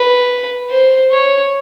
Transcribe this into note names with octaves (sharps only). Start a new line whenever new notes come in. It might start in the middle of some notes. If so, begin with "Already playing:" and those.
Already playing: B4
C5
C#5